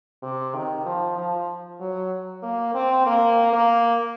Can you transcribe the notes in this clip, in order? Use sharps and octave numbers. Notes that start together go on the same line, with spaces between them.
C3
D#3
F3
F3
F#3
A#3
C4
A#3
A#3